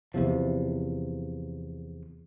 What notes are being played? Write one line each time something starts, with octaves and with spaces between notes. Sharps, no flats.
E2 C3 F3